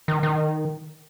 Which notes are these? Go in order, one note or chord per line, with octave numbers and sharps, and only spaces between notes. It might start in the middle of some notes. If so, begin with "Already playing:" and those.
D#3
D#3